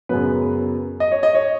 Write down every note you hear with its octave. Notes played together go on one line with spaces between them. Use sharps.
F#2 C#3 F#3 B3 B4
D#5
C#5
D#5
C#5